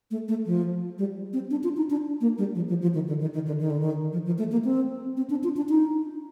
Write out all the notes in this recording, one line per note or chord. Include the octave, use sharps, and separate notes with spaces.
A3
A3
F3
G3
C4
D4
F4
D#4
D4
A#3
G3
F3
F3
F3
D#3
D3
D#3
D#3
D3
D#3
D3
D#3
F3
F3
A3
A#3
C4
C4
D4
F4
D4
D#4